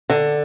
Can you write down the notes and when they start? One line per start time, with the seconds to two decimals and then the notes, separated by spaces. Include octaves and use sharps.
0.10 D3